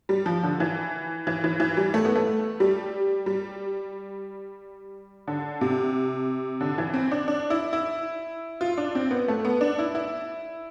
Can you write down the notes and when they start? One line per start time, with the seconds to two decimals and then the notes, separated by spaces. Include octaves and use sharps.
0.09 G3
0.26 F3
0.43 D3
0.60 E3
1.27 E3
1.44 E3
1.60 E3
1.77 G3
1.94 A3
2.05 B3
2.16 A3
2.60 G3
3.26 G3
5.28 D3
5.61 C3
6.61 D3
6.78 E3
6.94 C4
7.11 D4
7.28 D4
7.50 E4
7.73 E4
8.61 F4
8.77 D4
8.95 C4
9.11 B3
9.28 A3
9.45 B3
9.61 D4
9.79 E4
9.95 E4